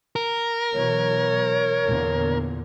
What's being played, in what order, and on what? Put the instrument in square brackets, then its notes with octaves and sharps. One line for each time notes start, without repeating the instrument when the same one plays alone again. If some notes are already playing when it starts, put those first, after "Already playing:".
[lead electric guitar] A#4
[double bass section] B2 E3 F#3 [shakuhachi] C#5
[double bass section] E2 A#2 D3